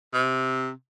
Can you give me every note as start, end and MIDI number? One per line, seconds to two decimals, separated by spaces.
0.14 0.71 48